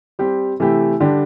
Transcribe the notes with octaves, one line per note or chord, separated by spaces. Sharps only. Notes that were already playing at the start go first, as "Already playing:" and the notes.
G3 C4 G4
C3 E3 A3 E4 G4
D3 G3 D4 G4